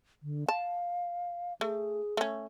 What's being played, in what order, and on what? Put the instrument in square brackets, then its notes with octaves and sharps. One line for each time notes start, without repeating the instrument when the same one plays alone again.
[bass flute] D3
[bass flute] F5 [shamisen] A5
[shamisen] A3 [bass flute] G#4
[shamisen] A3 C#4